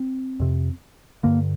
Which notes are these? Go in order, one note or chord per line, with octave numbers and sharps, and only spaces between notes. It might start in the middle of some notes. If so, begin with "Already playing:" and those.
Already playing: C4
F2 C3
G2 D3 A#3